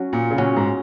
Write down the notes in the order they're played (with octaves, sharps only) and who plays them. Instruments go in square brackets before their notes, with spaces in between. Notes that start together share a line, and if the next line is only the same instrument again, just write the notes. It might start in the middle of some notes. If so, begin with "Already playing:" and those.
Already playing: [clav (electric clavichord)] F#3 C#4 F#4
[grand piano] A#2
C#3
[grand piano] A#2 [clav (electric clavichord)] F#3 C#4 F#4
[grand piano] G#2